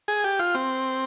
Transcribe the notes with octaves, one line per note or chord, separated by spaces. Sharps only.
G#4
G4
F4
C4